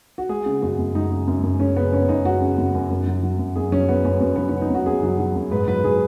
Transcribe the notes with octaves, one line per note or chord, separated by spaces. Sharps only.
F#4
G#3 G#4
C#3
F#2 F#4
F#2
G#3 D#4
C#3
F#2
F#2
G#3 C#4
C#3 B3
F#2 C#4
F#2 D#4
G#3 F#4
C#3
F#2
F#2
F#2
F#3
F#3
F#2
F#2 G#4
F#3 C#4
F#3 B3
F#2 C#4
F#2 B3
F#3 B3
F#3 C#4
D#4
F#2 F#4
F#2 G#4
F#3
F#3
F#2
G#2 B4
F#3 B4
F#3 G#4